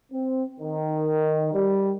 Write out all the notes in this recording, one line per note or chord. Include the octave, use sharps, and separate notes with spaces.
C4
D#3
G3